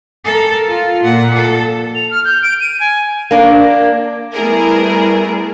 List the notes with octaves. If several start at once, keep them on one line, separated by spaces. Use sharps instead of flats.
A4 A#4
F4
A#2 F#5
A4
F7
F6
G6
D7
D#7
G#5
A#3 D4
G3 A3 B3 E4 G#4 A#4